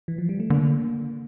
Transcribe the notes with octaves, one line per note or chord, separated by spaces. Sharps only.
E3
F3
G3
A3
D3 A#3